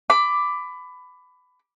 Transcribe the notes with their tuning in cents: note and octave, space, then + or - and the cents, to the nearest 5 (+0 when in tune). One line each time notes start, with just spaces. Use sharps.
B5 +20 D6 +0